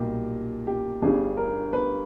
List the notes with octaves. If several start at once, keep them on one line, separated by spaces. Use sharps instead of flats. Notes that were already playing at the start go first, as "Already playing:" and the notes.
Already playing: B1 A#2 G3 G4
G4
G1 G2 G3 G#4
A#4
B4